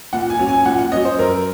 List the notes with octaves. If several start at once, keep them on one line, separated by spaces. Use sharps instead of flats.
A#2 F#5
G#5
F#3 C#4
G#5
A#2 F#5
F#5
F#3 C#4 D#5
C5
F#2 A#4